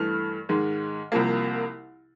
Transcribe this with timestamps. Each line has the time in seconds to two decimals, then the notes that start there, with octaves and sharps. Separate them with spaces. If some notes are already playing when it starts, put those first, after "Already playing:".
Already playing: G2 E3 A3 F6
0.49 G#2 D#3 G#3
1.12 C2 C3 F3 A#3